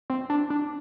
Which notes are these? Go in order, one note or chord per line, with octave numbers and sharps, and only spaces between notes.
C4
D4
D4